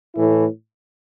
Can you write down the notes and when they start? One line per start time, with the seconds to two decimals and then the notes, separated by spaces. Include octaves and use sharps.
0.15 A2 E3 A3 E4